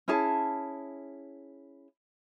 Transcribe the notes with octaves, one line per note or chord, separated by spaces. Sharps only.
C#4 E4 G#4 A5